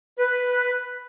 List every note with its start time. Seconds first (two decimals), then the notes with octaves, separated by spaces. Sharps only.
0.19 B4